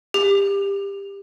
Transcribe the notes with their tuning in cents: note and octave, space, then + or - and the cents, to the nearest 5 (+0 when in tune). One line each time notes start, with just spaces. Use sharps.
G4 +20